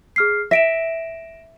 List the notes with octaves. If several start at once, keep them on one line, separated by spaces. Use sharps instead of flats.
G#4 F6 C7
E5 A#6 D7 E7